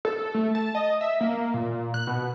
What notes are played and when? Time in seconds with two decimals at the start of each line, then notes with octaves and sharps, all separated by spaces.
0.05 A4
0.34 A3
0.55 A5
0.75 D#5
1.01 E5
1.21 A#3
1.54 A#2
1.94 F#6
2.07 B2